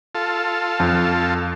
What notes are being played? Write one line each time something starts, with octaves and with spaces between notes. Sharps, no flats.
F4 A4
F2